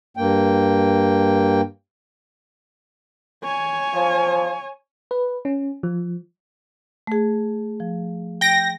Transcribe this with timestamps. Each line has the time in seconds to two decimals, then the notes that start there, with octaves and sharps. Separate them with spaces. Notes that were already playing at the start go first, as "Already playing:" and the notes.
0.17 G2 A#3 G5
3.44 C#5 G#5
3.94 F3
5.11 B4
5.45 C#4
5.83 F3
7.07 A3 G#4
7.80 F3
8.41 G5 A#6